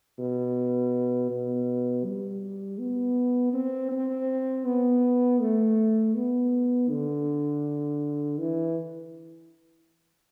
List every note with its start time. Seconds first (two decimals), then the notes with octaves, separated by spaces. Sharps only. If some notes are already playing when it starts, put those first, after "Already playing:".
0.18 B2
1.30 B2
2.05 G3
2.79 B3
3.53 C4
3.91 C4
4.65 B3
5.41 A3
6.15 B3
6.90 D3
8.39 E3